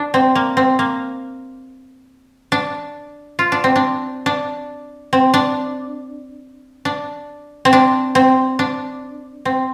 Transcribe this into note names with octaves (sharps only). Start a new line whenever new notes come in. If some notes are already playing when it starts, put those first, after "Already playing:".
Already playing: D4
C4
A#3
C4
A#3
D4
F4
D4
C4
D4
D4
C4
D4
D4
C4
D4
C4
D4
C4